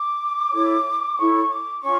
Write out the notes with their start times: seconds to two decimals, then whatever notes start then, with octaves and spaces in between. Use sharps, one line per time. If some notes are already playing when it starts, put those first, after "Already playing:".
Already playing: D6
0.52 E4 A4 C#5
1.17 E4 A4 C#5 C#6
1.50 D6
1.82 C#4 F4 C#6